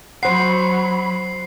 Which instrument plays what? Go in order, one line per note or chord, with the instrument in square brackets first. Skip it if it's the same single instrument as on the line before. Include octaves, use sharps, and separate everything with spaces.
[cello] F#3 [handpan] C5 F#5 [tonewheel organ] B5 [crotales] C7